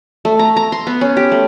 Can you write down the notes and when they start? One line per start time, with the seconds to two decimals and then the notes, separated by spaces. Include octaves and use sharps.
0.25 A3
0.39 A#5
0.57 A#5
0.72 C6
0.87 B3
1.01 C#4
1.17 G4
1.32 A3